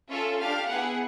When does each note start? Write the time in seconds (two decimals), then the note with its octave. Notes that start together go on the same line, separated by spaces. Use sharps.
0.09 C#4 F4 A4 E5
0.40 D4 G4 F5
0.69 B3 E4 G#4 F#5